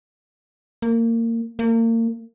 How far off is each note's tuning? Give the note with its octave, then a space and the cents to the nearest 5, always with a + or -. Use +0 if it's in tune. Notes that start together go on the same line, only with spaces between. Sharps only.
A#3 -25
A#3 -35